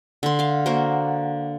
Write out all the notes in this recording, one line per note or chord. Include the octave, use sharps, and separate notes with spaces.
D3 C6
F5 C6
A#3 F#4 A#4 C5